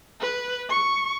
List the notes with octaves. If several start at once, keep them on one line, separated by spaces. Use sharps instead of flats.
B4
C#6